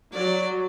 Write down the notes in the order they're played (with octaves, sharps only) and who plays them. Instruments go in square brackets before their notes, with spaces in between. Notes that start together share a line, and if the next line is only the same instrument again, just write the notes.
[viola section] F#3 [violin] D5